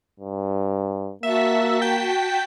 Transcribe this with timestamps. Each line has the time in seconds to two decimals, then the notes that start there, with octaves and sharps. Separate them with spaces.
0.20 G2
1.23 A#3 F#4 E5 A5 B6
1.82 G5